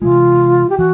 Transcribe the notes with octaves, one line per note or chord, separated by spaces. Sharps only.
C3 E3 G#3 F4
G4
E3 F#4